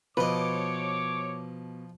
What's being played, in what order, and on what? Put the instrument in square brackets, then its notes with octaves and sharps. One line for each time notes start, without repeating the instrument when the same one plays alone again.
[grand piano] B2 [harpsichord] F3 D#5 [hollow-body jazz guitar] B4 [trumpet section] C#5 D6